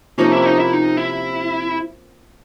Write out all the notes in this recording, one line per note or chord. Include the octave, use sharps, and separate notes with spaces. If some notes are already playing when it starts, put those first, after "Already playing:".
C3 F3 A#3 C#4 D#4
E4
D#4
E4
D#4
E4